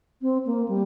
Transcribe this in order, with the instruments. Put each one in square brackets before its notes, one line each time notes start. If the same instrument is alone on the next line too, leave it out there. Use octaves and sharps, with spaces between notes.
[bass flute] C4
A#3
G3